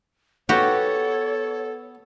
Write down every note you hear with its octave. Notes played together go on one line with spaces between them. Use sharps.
B3 F#4 G4 A4 C#5